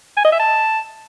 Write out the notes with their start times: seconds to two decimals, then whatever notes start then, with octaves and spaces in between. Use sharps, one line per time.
0.17 G#5
0.25 D#5
0.32 E5
0.40 A5